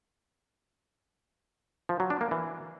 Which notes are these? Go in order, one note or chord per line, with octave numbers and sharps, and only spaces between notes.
F3
F#3
D4
A#3
E3